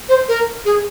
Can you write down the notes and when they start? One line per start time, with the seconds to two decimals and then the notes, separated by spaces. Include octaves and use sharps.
0.09 C5
0.28 A#4
0.65 G#4